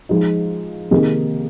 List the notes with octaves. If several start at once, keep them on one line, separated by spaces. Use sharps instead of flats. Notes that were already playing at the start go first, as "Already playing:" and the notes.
F3 G#3 D#4
C3 D#3 A#3 D#4 G#4